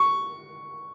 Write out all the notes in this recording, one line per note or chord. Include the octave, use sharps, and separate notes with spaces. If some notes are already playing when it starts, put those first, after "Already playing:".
Already playing: C#6